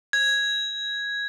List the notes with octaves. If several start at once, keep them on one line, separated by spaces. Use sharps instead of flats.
G#6